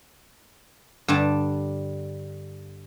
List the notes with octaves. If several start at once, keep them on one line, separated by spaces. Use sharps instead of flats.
G2 D3 G3 A5